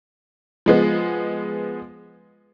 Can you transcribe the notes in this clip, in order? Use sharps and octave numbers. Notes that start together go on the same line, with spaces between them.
F3 G#3 B3